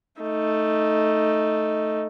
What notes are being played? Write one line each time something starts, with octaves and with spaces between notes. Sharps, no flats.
A3 D#4